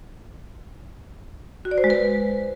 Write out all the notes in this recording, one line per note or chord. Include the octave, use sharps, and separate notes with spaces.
F#4
D5
C5
G#3
B4